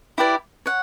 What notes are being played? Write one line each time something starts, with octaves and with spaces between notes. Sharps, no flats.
E4 G4 B4 D5
C#5 F#5